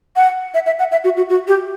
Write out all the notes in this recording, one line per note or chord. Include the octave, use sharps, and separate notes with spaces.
F#5
E5
E5
F#5
E5
F#4
F#4
F#4
G4